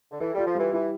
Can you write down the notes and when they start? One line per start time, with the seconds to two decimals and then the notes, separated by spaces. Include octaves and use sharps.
0.11 D3
0.20 E3 A4
0.34 G3 F4
0.46 F3
0.55 E3 G3
0.73 E3 E4